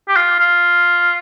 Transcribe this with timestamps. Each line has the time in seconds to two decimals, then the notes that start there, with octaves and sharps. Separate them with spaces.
0.08 G4
0.16 F4
0.39 F4